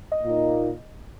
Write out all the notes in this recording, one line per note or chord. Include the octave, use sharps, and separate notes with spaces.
D#5
A#2 A#3 D#4